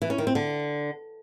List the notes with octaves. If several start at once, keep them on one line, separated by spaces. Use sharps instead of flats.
E3
C#4
D#3
C4
D3